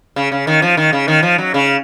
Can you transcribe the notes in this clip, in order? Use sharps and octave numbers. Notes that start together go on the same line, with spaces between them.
C#3
C#3
D#3
F3
D#3
C#3
D#3
F3
F#3
C#3